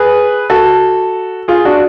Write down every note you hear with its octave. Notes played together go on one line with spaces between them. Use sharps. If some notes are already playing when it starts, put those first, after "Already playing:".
Already playing: G#4 B4
F#4 A4
F4 G#4
D4 F#4